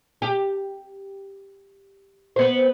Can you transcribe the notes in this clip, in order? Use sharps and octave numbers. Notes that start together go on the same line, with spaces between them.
G4
B3 C5